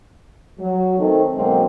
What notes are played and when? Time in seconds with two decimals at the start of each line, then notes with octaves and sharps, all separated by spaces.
0.59 F#3
0.98 D#3 A3 C4
1.35 B2 D3 F#3 G#3 A#3 C4